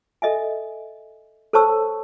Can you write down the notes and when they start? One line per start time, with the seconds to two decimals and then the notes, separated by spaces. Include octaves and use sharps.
0.22 A4 D#5 E5 G#5
1.53 A4 C5 C#5 A5 C#6 E6